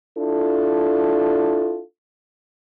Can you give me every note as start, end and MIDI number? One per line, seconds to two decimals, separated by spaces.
0.16 1.81 62
0.16 1.81 64
0.16 1.81 65
0.16 1.81 69